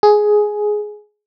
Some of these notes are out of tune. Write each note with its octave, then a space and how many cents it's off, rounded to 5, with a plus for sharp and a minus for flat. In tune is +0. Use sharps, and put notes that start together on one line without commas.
G#4 +10